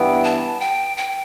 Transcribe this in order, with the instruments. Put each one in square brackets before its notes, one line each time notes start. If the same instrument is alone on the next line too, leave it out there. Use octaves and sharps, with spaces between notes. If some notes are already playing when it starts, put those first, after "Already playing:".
Already playing: [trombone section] G2 E3 B3 [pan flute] G5
[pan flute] A5
G5
G5